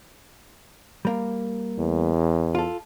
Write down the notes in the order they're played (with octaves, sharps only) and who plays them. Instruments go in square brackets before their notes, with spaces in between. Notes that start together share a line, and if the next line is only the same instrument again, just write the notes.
[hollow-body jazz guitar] G3 A#3
[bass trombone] E2
[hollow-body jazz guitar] F4 A4